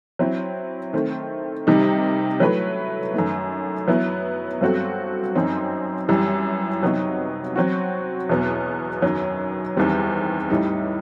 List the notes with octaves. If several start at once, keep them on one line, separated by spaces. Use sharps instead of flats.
F#3 C4 E4
D#3 A3 C4
C3 D#3 G3 D#4
F#3 A3 E4 B4
F#2 D#3 A3
F#3 B3 E4
G2 F#3 C4 F#4 A4
F#2 F#3 C4 D#4
F#2 E3 G3
C3 F#3 B3 D#4 F#4
F#3 C4 F#4
E2 B2 F#3 B3
F#2 D#3 F#3
E2 D#3 G3 C4
A2 G3 D#4